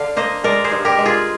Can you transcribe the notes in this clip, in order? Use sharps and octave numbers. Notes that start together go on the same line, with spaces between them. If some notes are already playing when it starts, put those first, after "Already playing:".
Already playing: D3 F5
A#3 C5 D#5
G#3 A#4 D5
G#4 C5
G2
G4 A#4
G#3
F4 G#4